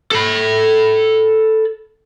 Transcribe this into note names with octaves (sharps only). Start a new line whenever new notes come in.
A4 B5